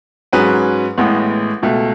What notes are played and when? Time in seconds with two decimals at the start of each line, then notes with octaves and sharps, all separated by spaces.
0.33 G#2 F#3 C#4 G#4 B4
0.98 A1 A2 G#3 B3
1.63 C#2 B2 A3